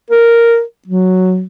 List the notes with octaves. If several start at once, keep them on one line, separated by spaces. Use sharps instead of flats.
A#4
F#3